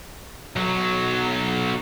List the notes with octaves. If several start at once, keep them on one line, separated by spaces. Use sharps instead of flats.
B1 F#3